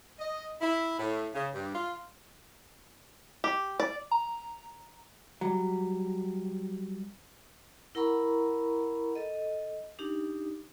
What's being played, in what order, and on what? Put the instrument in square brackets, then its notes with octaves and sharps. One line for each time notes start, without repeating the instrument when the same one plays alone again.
[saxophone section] D#5
E4
A2
C#3
G2
F4
[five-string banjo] G4
D5
[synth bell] A#5
[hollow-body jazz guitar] F#3 G3
[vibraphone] E4 A#4 F#5 A#5 B5 C#6
A4 D#5
D4 D#4 G4